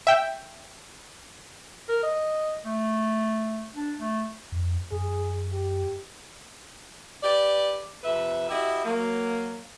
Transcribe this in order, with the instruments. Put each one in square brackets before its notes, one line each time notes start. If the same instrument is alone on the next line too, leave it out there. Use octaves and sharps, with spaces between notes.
[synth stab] E5 G5
[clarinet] A#4
D#5
A3
D4
A3
[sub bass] F2
[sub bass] F#2 [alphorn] G#4
[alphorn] G4
[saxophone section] G4 B4 D5
F2 C3 B4 E5
E4 F#4 G4 D#5 E5
F#3 A#3